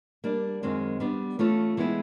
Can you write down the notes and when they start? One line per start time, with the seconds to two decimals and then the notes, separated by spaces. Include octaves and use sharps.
0.24 G3 A#3 D4
0.63 F#2 D#3 G#3 C4
1.00 G3 B3 D4
1.39 E3 A3 C#4 F4 A4
1.77 E3 G#3 B3 E4